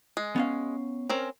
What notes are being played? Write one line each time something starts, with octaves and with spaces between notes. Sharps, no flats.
G#3
B3 C#4 F5
C4 C#4 A#4